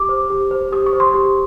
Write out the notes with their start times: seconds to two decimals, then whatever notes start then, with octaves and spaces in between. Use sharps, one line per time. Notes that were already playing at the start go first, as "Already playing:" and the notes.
Already playing: G4 D6
0.09 C5
0.30 G4
0.51 C5
0.72 G4 D#6
0.86 C#6
0.93 C5
1.00 C6
1.14 G4